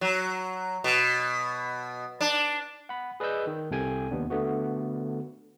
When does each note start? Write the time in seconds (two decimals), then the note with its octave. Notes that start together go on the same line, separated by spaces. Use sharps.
0.01 F#3
0.84 B2
2.21 D4
2.89 F#5 B5
3.20 G#4 B4 D5 D#5 E6 G6
3.47 D#3
3.71 C2 C3 A4 G5 G#5
4.11 D#2 B3 D4
4.30 D3 A3 B3 F#4